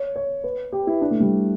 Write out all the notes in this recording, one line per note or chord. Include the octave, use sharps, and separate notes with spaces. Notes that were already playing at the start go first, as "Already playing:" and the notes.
Already playing: C#5
C#5
B4
G4
E4
D4
A3
G3